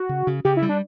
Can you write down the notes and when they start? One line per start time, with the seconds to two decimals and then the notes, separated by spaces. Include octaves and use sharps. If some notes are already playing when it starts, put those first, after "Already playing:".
Already playing: F#4
0.09 C#3
0.27 C#3
0.45 C#3 G4
0.57 E4
0.62 G3
0.69 D4